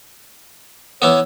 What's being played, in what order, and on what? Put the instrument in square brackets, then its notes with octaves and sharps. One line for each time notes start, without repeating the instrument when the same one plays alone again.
[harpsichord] E3 B3 [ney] C#5